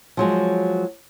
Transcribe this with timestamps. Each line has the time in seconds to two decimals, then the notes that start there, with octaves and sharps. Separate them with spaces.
0.17 F3 F#3 G#3